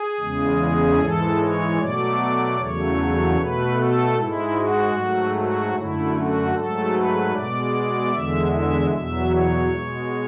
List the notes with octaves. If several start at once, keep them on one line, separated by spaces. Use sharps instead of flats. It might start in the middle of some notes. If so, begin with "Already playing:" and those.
Already playing: G#4
E2 C#3 G#3
G#2 E3 G#3 A4
C#5
B2 F#3 A3 D5
E2 C#3 F#3 A3 C#5
B2 A3 B4
A4
G#2 G#3 E4
F#4
G#2 F#3 A3
F#4
F#2 D3 A3 E4
F#4
G#2 F#3 A3 A4
B4
B2 G#3 D5
E2 D3 G#3 E5
E5
E2 B2 F#3 E5
C#5
B2 G#3